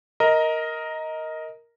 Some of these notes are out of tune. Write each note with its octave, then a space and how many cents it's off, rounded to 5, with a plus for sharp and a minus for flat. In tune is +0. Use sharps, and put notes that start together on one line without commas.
A#4 +0 D#5 +15 A#5 +0